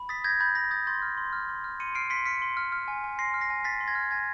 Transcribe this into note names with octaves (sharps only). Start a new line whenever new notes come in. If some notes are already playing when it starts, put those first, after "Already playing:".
Already playing: B5
D#6 A6 B6
G6 G#6 A#6
B5 G6 A6
B5 G#6 A#6
D#6 G6 A6
C6 G6 A6
F6
C6
F6
C6
F6
C6 C#7 D#7
F6 C7 D7
C6 B6 C#7
F6 B6 C#7
C6
F6
F6
G#5
G#5
C6 A#6 C7
F6
A#6 C7
G#5
G#5 A6 B6
C6
G#6 A#6
F6
G#5 G#6 A#6